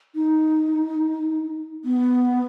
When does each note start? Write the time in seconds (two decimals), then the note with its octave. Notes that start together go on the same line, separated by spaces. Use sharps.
0.16 D#4
1.85 B3